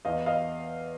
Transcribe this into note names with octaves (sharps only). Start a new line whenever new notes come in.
E2 D#5 F5
D#5 F5